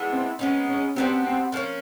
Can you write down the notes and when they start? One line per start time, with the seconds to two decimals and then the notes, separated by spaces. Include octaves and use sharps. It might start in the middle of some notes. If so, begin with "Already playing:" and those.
Already playing: E3 G#3 B3 D4
0.11 C4
0.39 G#3 B3 C#4 D#4
0.68 C#4
0.96 F#3 B3 C4 D4 G4
1.24 C4
1.52 D3 F3 A#3 C#4